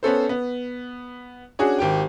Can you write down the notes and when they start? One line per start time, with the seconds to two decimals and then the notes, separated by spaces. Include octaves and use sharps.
0.03 B3 C#4 A4 C5
0.29 B3
1.59 C#4 D4 F#4 G#4
1.78 G#1 G4 G5